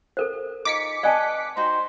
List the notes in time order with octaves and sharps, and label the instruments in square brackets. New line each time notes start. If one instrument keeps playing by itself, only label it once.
[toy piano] A4 A#4 C5
[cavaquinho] D#4 F4 G#5 [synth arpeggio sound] D6 B6 C#7
[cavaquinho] B4 D#5 F#5 [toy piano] D5 G#5 A5
[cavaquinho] D#4 F#4 G5 [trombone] C5